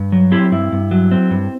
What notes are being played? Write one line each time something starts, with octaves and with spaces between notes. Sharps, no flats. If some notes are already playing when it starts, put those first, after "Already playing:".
Already playing: G2
F#3
C4 E4 G4
G2 E4
G2
F#3
C4
G2